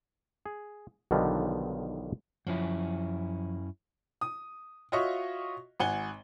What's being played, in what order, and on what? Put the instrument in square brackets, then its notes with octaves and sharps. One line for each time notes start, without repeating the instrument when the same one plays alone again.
[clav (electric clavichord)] G#4
B1 B2 D3 D#3 F3 G3
[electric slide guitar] F#2 C#4 E4 [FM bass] F3
[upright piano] D#6
F4 F#4 C#5 D#5 E5 C#6
G#1 F#5 G#5 G7